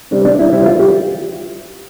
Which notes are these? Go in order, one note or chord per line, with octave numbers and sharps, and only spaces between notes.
C3 G3 C4 D4
D4
E4
C3 G3 C4 E4
F4
G4